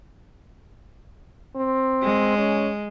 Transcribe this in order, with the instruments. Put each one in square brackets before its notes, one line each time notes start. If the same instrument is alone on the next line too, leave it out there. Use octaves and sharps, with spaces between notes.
[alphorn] C4
[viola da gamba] G#3
[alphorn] C#4